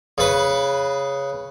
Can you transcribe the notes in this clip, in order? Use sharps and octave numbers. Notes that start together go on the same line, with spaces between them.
C#3 B4